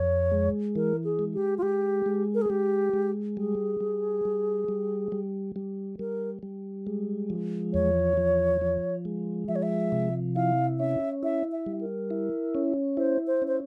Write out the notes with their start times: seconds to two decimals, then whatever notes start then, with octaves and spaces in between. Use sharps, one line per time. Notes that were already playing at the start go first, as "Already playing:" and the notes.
Already playing: F2 C#5
0.32 G#3
0.76 E3 A#4
1.04 G#4
1.19 G#3
1.34 G4
1.58 F4
1.62 G#3 G4
2.06 G#3
2.35 A#4
2.42 G#4
2.50 G#3 G4
2.93 G#3
3.37 G3 G#4
3.81 G3
4.25 G3
4.68 G3
5.12 G3
5.56 G3
5.99 G3 A#4
6.43 G3
6.87 G#3
7.30 F3
7.73 E2 C#5
8.17 F3
8.61 F3
9.05 G#3
9.48 F3 E5
9.56 C#5
9.63 E5
9.92 C3
10.36 E4 F5
10.79 C#4 E5
11.23 E4 E5
11.52 E5
11.66 G3
11.81 A#4
12.10 E4
12.55 C#4
12.97 E4 C5
13.27 C5
13.42 C#4
13.48 C5